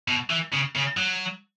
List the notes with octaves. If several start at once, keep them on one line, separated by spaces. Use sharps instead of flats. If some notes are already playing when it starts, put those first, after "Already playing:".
B2
E3
C#3
C#3
F#3